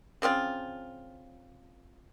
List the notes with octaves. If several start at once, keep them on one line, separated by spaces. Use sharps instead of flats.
C#3 F3 C4 F4